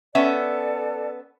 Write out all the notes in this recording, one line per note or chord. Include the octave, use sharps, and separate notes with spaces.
B3 C#4 A4 D5 E5 A5